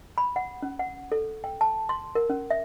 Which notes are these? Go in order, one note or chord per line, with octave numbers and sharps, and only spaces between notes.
B5
F#5
C#4
F#5
A4
G5
A5
C6
A#4
C#4
E5